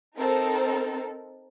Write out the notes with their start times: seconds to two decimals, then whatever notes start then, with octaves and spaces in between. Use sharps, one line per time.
0.18 C4 D#4 A4 A#4